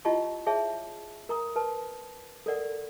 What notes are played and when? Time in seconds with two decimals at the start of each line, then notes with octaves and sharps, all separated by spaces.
0.05 E4 F4 G4 D#5 A5 C#6
0.47 G#4 C#5 E5 A5
1.29 A#4 A#5 D#6
1.56 A#4 B4 A5
2.46 A4 A#4 D5 F#5